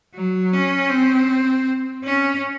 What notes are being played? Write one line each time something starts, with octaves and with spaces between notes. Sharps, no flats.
F#3
C#4
C4
C#4